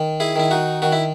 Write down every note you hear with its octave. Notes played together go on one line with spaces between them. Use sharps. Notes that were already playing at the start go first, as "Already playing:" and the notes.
Already playing: D#3
E4 G#4
D#3 E4
D#4 F#4
D#3 F#4
E4